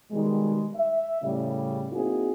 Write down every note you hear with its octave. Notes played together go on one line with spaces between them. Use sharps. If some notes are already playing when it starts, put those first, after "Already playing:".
B2 D#3 G3 G#3
E5
A2 C#3 G3
A#3 C4 D#4 E4 F#4 G#4